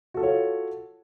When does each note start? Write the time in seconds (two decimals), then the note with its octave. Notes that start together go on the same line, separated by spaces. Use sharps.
0.14 F#4
0.17 A4
0.20 F4
0.23 C#5